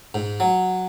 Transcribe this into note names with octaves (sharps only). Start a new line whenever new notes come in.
G#2
F#3